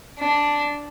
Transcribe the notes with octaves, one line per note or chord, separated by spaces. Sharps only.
D4